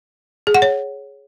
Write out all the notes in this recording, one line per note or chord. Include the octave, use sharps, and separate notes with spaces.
G#4
F#5
C#5